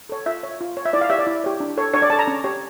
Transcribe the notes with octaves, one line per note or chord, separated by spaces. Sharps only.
A4 C#5
F4 E5
C#5
F4
C#5
E5
E4 D5
F5
G4 C#5 E5
D5
E4
G4 C#5
D4
A4 C#5
D4 C#5
D5
A4 C#5 A5
A#5
C#4
G4 C#5